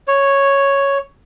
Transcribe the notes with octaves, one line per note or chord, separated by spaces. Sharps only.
C#5